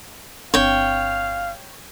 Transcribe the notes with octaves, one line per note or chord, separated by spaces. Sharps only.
G1 C4 D4 C#5 F5 G5